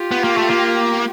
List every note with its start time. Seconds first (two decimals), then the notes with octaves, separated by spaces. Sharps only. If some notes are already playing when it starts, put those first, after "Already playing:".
Already playing: F4 G4
0.11 B3
0.24 A#3
0.37 A3
0.50 A#3